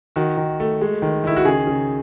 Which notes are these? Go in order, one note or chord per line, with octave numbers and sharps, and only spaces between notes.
D#3 F#4
D#3
A3
G#3
D#3
D#3 E4
F#4
C#3 G#4
C#3